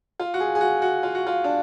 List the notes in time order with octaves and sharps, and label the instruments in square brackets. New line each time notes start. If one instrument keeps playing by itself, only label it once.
[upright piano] F4
F#4
G#4
G#4
F#4
F#4
F4
F#4
F4
D4